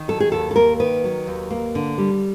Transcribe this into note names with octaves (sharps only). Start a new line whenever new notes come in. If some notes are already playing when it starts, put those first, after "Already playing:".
Already playing: D#3
F#3 A4
G#4
D#2 A4
A4
A#3 A#4
D#3 B4
F#3
D#2
A#3
D3
G3